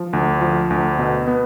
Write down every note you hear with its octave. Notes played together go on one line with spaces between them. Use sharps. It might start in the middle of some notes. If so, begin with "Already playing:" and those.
Already playing: F3
D2
F3
D2
B2
B3